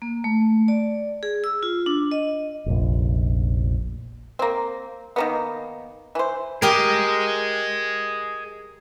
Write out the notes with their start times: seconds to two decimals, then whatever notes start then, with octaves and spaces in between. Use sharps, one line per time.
0.02 A#3
0.24 A3
0.68 D5
1.23 G#4
1.44 E6
1.63 F4
1.86 D4
2.11 D#5
2.66 F1 A#1
4.39 A#3 C4
5.16 D#3 A#3 B3
6.15 E3 C5
6.62 G4 G#4 A#4 D#5